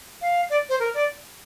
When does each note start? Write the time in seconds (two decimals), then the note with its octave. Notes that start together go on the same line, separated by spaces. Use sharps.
0.21 F5
0.50 D5
0.69 C5
0.80 A#4
0.94 D5